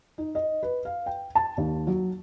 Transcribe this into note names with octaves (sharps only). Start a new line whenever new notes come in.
D#4
D#5
B4
F5
G5
A5
D#2
F#3